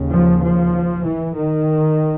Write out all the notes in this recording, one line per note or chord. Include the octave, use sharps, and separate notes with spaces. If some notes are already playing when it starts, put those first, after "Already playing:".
Already playing: D#2 C#3
F3
F3
E3
D#3